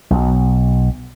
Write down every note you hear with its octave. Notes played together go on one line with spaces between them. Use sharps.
B1